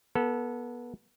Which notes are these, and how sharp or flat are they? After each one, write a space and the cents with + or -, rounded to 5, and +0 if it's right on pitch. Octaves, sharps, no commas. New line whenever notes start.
B3 -25 A4 +0